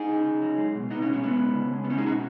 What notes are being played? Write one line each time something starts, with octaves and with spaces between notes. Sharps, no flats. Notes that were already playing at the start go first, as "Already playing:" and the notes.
Already playing: D#4 G#4
C#3
C#3
F#3
G#3
B2
B2 B3 D#4
C#4
G#3
C#4
G#3 B3
C#3
C#3
G#3
B3
G#3 C#4
D#4 G#4
B2 C#4 F#4